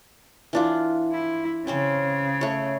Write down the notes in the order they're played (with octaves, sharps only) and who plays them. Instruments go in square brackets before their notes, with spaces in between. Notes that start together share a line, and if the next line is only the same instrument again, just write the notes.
[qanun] E3 D4 F4
[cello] E4
[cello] C#3 [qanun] C4 C#4 C5
[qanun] A3 C#5